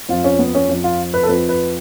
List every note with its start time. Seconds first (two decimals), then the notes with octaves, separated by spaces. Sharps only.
0.09 F2 F3 F4
0.24 C#4
0.39 B3
0.55 C#4
0.68 F2 F3
0.84 F4
1.14 B4
1.23 A4
1.28 F2 F3 B4
1.49 B4